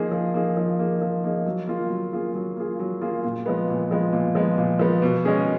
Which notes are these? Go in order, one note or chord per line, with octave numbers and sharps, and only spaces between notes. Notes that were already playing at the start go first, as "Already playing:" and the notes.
Already playing: F3 A#3 D#4 G#4
F3
A#3 D#4 G#4
F3
A#3 D#4 G#4
F3
A#3 D#4 G#4
F#3
A#3 F4 G#4
F#3
A#3 F4 G#4
F#3
A#3 F4 G#4
F#3
A#3 F4 G#4
A#2
F3 G#3 B3
A#2
F3 G#3 B3
A#2
F3 G#3 B3
A#2
F3 G#3 B3
B2
G#3 C#4 G#4